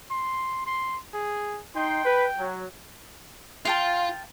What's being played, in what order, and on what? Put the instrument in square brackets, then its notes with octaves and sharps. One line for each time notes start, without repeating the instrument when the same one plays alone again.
[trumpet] C6
C6
G#4
[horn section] D#4 C6 [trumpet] G5
[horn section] B4
F#3
[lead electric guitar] F4 [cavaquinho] F5 G5 A5